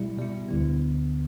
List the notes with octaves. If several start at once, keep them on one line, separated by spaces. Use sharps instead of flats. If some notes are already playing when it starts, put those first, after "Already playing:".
Already playing: B2 G3 E4
B2 G3 E4
D2 D3 B3